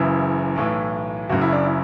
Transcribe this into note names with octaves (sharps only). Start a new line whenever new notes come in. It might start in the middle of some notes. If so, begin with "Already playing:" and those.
Already playing: F#1 F#2 C#3 E3 E4
B1 A2 E3
F#1 F#2 C#3 F#4
E4
D4
E4